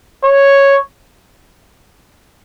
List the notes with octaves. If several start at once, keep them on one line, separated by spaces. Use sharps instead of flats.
C#5